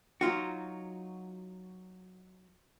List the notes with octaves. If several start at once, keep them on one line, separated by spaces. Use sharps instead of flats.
F#3 D#4 F4 F#4